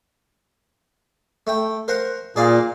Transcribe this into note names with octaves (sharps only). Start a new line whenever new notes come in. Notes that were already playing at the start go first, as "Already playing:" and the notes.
A3 G5
A#4 C5 F#5
A#2 G#4 D5 F5